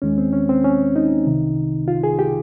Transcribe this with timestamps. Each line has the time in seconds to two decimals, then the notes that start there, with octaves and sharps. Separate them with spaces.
0.02 D#2 D#3 G#3 C#4
0.18 C4
0.33 C#4
0.49 C4
0.64 C#4
0.96 D#4
1.27 C2 C3 D#3
1.88 F4
2.04 G#4
2.19 G4